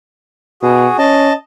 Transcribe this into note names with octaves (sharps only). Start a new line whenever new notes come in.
B2 F#4 G#4
C#4 D#5 A5